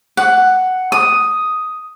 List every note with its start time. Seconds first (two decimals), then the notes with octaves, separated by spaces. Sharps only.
0.17 F#5
0.92 D#6